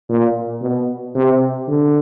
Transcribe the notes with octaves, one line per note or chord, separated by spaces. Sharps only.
A#2
B2
C3
D3